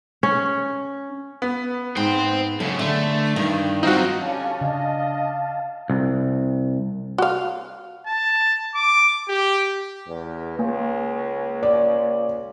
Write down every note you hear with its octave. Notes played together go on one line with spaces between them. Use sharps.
C#4
B3
G#2 C5 G5
F#2 C#3 A4
D3 A3
G2 D#3
F#3 C4 D#4 F4 F#4
D3 G3 C#4 F5 A5
C#3 D4 D#5
C2
F#4 F5
A5
D6
G4
E2
C#2 A#3 G#5
D5